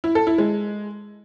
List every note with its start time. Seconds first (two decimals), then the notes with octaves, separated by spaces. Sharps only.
0.04 E4
0.15 A4
0.27 E4
0.38 G#3